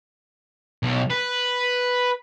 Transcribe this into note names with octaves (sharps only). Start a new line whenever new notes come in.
B1
B4